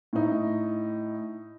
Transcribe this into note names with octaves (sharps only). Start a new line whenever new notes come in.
A2 D#4